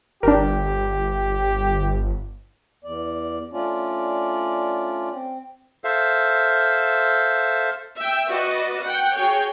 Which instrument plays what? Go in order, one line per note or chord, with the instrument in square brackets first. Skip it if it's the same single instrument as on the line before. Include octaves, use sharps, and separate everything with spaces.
[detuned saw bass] G1 [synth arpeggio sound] D4 A#4 [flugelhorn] G4
[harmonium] E2 D5
A3 C#4 D4 F4 D5
C4
[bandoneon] A4 C5 E5 F5
[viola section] E5 G5
F#4 B4 D5 D#5
F#5 G5
F#4 G#4 C#5 G5